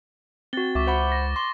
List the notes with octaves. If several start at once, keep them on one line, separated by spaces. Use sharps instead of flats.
C4 F#4 A6 G7
C#2 E5 C#6 D6 A6
C5 F#5 B5
A#6
C6 G7